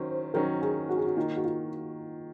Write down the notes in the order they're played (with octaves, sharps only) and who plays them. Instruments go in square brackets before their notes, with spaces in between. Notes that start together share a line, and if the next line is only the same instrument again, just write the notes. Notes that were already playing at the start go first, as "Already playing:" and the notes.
Already playing: [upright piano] D#3 F#3 C#4 [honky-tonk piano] C5
[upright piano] D#3 F#3 C#4 [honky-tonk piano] A#4
[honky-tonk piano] G#4
F#4
G#4
F#4
[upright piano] D#3 A#3 D#4 [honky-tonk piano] F4
[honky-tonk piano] F#4
F4